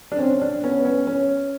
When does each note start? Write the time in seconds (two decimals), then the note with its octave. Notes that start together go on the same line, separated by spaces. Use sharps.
0.12 D4
0.19 C4 C#4
0.42 D4
0.63 B3 C#4
0.85 C#4
1.07 C#4